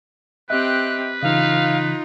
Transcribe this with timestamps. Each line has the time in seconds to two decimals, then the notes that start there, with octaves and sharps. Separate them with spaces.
0.50 C4 G4 B4 D#5 E5 F#6
1.23 C#3 E3 D#4 F4 F5